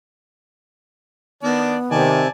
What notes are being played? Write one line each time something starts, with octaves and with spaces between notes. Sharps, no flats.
D#3 B3 D4 D5
C3 D#3 D5 G#5 A5